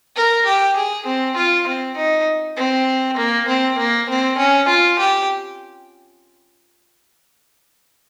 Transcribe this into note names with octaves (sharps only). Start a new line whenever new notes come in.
A#4
G4
G#4
C4
F4
C4
D#4
C4
A#3
C4
A#3
C4
C#4
F4
G4